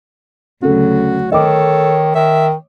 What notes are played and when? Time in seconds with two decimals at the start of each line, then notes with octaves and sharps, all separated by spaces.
0.62 D2 C#3 F#3 F#4 A4
1.32 D#3 A4 C#5 D#5 D6
2.15 D#3 E5